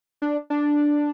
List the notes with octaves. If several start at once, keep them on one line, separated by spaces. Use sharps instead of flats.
D4
D4